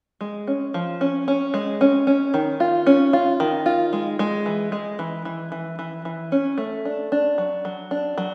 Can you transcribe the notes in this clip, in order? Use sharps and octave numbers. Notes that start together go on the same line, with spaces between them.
G#3
C#4
F3
C#4
C#4
G#3
C#4
C#4
D#3
F4
C#4
F4
D#3
F4
G#3
G#3
E3
G#3
E3
E3
E3
E3
E3
C#4
A3
D4
D4
F#3
F#3
D4
F#3